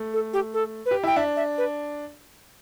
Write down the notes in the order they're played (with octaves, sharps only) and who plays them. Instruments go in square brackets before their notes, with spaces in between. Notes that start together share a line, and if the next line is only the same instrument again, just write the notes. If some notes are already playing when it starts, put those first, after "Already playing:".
Already playing: [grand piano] A3
[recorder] A4
G4
A4
B4
[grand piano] G4
[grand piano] E4 [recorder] G5
[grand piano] D4 [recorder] E5
[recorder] E5
B4